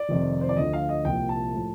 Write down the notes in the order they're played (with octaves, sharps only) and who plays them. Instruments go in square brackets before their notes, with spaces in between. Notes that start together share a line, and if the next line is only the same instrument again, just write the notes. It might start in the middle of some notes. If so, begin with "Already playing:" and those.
Already playing: [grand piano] D5
F1 F2 C3 D#3
C5
D5
D2 D3 F3 D#5
F5
D#5
C2 A#2 F3 G5
A5
A2 F3